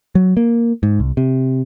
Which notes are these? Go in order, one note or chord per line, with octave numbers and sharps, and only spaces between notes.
F#3
A#3
G#2
C2
C3